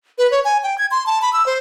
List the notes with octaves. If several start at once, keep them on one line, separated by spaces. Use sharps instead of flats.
B4
C#5
G#5
G5
G#6
C6
A5
B5
E6
C5